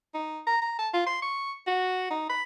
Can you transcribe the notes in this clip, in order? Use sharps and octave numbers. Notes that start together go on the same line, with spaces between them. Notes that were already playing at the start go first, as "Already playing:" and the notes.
D#4
A#5
A#5
A5
F4
C6
C#6
F#4
D#4
B5